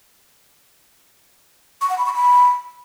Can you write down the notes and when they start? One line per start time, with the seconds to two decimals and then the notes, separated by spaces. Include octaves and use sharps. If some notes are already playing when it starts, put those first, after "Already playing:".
1.81 C#6
1.90 F#5
1.98 B5
2.06 C#6
2.14 B5